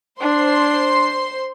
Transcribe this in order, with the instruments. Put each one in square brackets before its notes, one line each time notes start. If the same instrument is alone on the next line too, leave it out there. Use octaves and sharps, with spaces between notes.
[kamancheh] D4 [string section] C5 C6